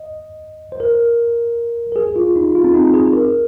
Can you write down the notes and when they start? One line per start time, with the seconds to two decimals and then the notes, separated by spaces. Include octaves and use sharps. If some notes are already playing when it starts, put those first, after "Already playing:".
Already playing: D#5
0.72 C5
0.80 A#4
1.92 A#4
1.96 G#4
2.16 F4
2.36 D#4
2.55 F4
2.64 C4
2.74 D#4
2.94 G#4
3.13 A#4